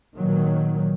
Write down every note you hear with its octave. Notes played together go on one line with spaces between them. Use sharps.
A#2 D#3 F#3